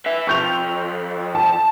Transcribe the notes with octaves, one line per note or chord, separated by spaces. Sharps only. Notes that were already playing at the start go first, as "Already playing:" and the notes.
B4 E5
F2 C#6 G6 F7
A5